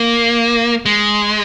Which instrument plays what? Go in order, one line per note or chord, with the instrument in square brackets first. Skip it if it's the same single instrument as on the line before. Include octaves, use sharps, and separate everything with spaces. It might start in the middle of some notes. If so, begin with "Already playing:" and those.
Already playing: [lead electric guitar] A#3
G#3